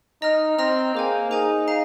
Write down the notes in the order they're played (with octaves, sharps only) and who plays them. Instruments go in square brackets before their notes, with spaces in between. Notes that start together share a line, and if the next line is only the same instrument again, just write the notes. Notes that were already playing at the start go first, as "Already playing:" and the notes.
[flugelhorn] D#4 [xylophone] D#5 A#5 F6
[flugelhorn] C4 [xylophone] D#5 A#5 F6
[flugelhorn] A#3 [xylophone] G#4 C5 G#5
[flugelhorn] D#4 [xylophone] G#4 C5 G#5
[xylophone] F5 A#5